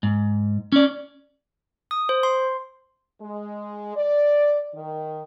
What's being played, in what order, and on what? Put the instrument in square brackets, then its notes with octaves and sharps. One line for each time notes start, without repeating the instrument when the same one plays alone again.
[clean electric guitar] G#2
C#4 D5
[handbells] D#6
C5
C6
[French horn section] G#3
D5
D#3